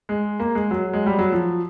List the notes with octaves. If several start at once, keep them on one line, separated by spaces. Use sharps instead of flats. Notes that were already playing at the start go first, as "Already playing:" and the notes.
G#3
A#3
G#3
F#3
G#3
G3
F#3
F3